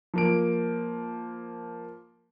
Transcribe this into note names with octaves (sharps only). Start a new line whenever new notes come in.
F3 A#3 D7